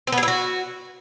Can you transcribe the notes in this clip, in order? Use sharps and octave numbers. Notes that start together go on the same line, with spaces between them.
C4
B3
G#4
E4
F#4